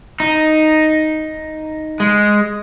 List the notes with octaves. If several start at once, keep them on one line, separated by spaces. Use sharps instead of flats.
D#4
G#3